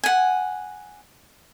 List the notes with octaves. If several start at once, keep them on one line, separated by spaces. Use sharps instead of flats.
F#5 G#5